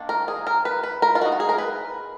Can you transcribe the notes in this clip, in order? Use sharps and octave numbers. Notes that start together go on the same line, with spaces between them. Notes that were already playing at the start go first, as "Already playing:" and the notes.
Already playing: D#3 A#3 D4
A#4
G#4
A#4
B4
B4
A#4
F4
G#3 D#4 F#4
F#4
G#4
A#4
B4